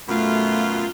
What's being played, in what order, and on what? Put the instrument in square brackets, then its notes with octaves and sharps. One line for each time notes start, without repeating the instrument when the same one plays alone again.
[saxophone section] F#2 B2 F4 [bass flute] A3